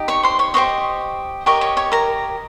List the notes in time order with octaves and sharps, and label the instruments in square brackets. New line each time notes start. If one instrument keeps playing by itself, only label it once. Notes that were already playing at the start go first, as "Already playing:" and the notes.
Already playing: [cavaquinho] D#4 G4 D#5
C#5 C#6
C5 C6
C#5 C#6
G4 C5 C#5 D#5 C#6
G4 A#4 C#5 D#5 C#6
C#5 C#6
C#5 C#6
A#4 A#5